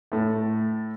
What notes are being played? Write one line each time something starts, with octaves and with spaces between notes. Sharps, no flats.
A2 A3